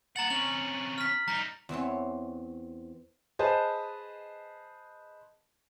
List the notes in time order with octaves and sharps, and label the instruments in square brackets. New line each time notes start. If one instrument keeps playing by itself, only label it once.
[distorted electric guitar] A#3 F#5 [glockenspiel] A#5 A6 F#7
[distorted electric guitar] C3 C#4 [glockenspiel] F#7
[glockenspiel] F6 B6
[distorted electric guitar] G3 D#4 [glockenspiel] A#5
[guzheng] E2 E3 C4 C#5
[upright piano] G#4 B4 C5 D#5 A5